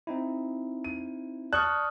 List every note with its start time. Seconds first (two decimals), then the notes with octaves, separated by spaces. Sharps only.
0.07 C4 D#4 E4
0.84 D#7
1.53 D5 A5 C#6 D#6 F6 F#6